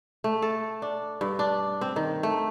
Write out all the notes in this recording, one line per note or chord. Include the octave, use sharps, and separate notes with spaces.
A3
A4
D4
G2
D4
C4
D#3
A3